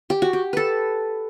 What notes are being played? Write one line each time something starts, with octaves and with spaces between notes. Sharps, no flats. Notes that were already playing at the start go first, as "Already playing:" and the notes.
G4
F#4
G4
A4 B4